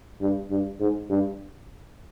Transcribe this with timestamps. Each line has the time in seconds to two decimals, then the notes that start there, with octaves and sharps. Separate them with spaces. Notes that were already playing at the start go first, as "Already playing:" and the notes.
0.21 G2
0.51 G2
0.80 G#2
1.10 G2